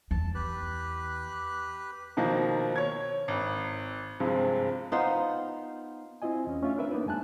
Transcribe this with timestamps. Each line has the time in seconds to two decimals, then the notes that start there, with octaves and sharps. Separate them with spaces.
0.11 E2 A5
0.35 G4 B4 F#6
2.17 B2 D#3 F3 A#3
2.76 C#5 G#6
3.28 G#1
4.20 G2 C3 F3 G#3
4.92 B3 D#4 F4 C5
6.22 C4 E4 F4 D#5 G#5
6.47 E2 C#4
6.62 A3 C#4 D4 F4 E5
6.77 C4 D4 A#4 B4 E5
6.91 A#3 B3 D4 D#4 B4
7.06 F#2 G#3 G#5 A5 F#6